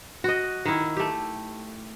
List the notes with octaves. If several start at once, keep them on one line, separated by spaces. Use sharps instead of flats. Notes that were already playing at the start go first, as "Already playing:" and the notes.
F#4 D#5
D#3 E4
A3 G4